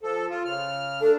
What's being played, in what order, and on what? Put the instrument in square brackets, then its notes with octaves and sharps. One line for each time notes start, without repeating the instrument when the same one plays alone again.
[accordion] F3 A4
F4
C#3 F6
[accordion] A3 D4 [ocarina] A4